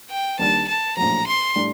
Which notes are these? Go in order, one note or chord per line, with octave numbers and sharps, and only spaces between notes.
G5
D#2 D#3 G3 D4 A5
A5
A#1 A2 F#3 A#5
C6
A2 G3 D4